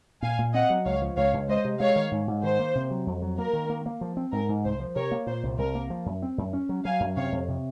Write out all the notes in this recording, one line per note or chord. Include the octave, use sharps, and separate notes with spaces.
A#2 F5 G#5
A#2
C4 D#5 F#5
F#3
C#2 C#5 F5
F3
C#2 C#5 F5
C#2
G#3 C5 D#5
C3
G#3 C#5 F5
D#3
G#2
G#2
D#3 C5
A#3
C3
F#3
F2
F#3
A#3 A#4
D#3
A#3
A#3
F3
C4
G#2 A#4
G#2
C2 C5
F3
C3 A#4 C#5
A#3
A#2 C5
C2
C2 A#4
A#3
F3
F#2
C4
F#2
C#4
F#3
F#3 F5 G#5
F#2
C3 C#5 F5
F2
C3